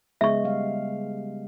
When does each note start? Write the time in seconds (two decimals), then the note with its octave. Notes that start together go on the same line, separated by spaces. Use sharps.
0.21 C#3 G#3 B3 E5 C#6
0.44 G3 F5